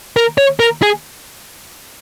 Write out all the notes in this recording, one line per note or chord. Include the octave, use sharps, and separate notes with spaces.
A#4
C#5
A#4
G#4